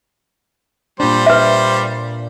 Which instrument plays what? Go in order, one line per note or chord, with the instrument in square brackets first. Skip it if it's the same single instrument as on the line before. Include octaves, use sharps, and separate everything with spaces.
[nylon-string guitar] A#2 D4 [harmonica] G3 C5
[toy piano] B4 E5